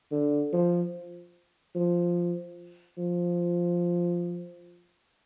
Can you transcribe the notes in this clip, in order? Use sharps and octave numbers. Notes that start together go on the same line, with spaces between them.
D3
F3
F3
F3